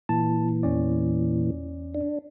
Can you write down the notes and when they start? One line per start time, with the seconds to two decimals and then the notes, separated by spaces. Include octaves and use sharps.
0.09 A#2 E3 A5
0.63 E2 C#4 D5
1.94 D4